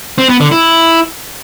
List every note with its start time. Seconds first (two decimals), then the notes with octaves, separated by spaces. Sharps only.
0.18 C4
0.29 B3
0.40 D3
0.51 E4